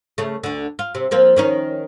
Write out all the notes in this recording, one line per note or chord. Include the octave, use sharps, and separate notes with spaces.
C#3 A3
D2 D3
F4
C3
F3 A#3 C4
D#3 C#4 D#4